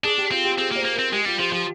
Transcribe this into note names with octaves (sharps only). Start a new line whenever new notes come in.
D4 G#4
G4
C4 F4
G4
C4 G#4
A#3 C5
A#3
A#4
C4
G#3 G4
G3 F4
F3 G4
F3 G4